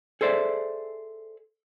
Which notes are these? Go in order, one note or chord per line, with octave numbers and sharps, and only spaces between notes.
G#4 A4 C5 D5 E5